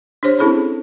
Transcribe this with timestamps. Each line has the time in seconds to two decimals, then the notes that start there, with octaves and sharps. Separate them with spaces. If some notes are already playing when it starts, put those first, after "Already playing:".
0.23 D4 G4 C5 C#5
0.39 C4 C#4 E4 G#4 A4 B5